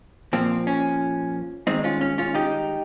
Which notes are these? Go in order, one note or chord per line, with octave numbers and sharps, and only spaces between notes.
A#2 F3 A#3 C4
C#4
G2 D#3 G#3 C4 D#4
C#4 F4
C#4
C#4 F4
D#4 G4